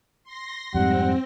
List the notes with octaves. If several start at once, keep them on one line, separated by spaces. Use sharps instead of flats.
C6 A#6
F2 G#2 G3 C4 F#5